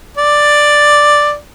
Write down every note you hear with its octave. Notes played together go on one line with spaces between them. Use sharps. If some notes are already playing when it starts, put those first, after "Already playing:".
D5